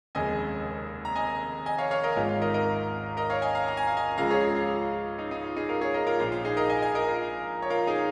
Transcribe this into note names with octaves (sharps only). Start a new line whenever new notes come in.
F1 D#2 C#3 G#3 D#5 G#5
A#5
D#5 G#5
D#5 G#5
C#5 F5
C#5 F5
A#4 D#5
G#1 G#2 D#3 G#3 F4
F4
A#4 D#5
A#4 D#5
A#4 D#5
C#5 F5
D#5 G#5
F5 A#5
A#5
G#5
F5
D#5 G#5
C#2 C#3 F3 G#3 F5 A#5
G#4 C#5
G#4
F4
D#4
D#4
F4
D#4 G#4
F4 A#4
G#4 C#5
A#4 D#5
F4 A#4
A#1 A#2 F3 F4
F4
D#4 G#4
A#4 D#5
D#5 G#5
D#5 G#5
A#4 D#5
F4
C#5
F4 A#4
D#4 G#4